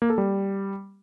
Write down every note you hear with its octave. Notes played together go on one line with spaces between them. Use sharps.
A#3
A4
G3